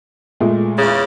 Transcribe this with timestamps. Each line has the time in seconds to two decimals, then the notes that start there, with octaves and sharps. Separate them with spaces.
0.40 A#2 G#3 A3
0.78 E2 C#3